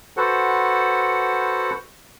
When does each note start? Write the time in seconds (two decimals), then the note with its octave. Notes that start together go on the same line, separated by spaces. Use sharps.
0.17 F#4 A4 B4 C5 F#5